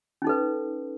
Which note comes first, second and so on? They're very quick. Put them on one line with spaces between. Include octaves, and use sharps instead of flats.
C#4 D#4 A4 B4